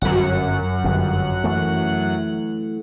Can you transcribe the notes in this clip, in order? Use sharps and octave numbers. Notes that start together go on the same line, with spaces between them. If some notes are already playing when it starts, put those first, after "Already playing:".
G1 F#2 F#3 F#5
G1 F2
E3 A3